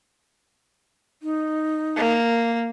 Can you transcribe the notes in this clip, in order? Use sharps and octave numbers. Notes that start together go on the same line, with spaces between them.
D#4
A#3